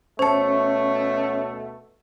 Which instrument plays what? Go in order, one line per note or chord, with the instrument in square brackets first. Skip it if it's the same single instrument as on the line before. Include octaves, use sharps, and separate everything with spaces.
[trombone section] D2 B2 A3 [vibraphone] C#4 C#5 [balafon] C5 A5